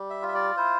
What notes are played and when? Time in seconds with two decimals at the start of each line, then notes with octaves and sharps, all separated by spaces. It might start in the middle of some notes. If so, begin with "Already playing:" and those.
Already playing: G3
0.10 E5
0.22 F4
0.28 E5
0.34 D5
0.57 E4 C5